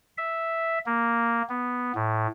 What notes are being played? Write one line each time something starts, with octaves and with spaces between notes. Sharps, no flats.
E5
A#3
B3
A2